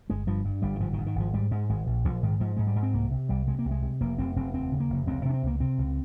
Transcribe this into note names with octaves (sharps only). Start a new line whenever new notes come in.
G1 G#3
G2 F3
G2
G1 G3
D#3
G#2 F3
D#3
G#2
D#3
G#1 F3
G#2 G3
G#2 G#3
G#1 G#3
A#1
A#1 F3
G#2 D#3
G#2 F3
G#2 G#3
G3
G#2
C4
C2 A#3
C3
C2 G3
C3 G#3
A#3
C2
G#3
C3
F1 A#3
F1 C4
F1 C4
D#2 C4
C#3
A#3
F1
C#2 C4
C3 C#4
C4
C#2 A#3
C3 C4
C#2